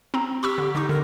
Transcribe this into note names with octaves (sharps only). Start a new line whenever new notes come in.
C4 A#5
G4 B5 C#6 E6
D3
D3 D#4 C#6
D3 A#4